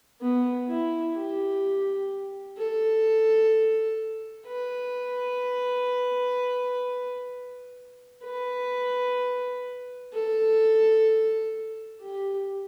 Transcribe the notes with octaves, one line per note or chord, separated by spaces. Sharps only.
B3
E4
G4
A4
B4
B4
A4
G4